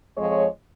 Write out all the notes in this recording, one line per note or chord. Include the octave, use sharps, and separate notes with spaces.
F2 F3 G#3 C#5